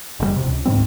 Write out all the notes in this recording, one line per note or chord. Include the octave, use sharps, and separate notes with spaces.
F#1 C3 G3
E1 B1 C3
C#2
D2 G#2 G3 C4